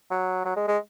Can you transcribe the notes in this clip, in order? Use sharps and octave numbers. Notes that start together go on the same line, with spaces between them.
F#3
F#3
G#3
G#3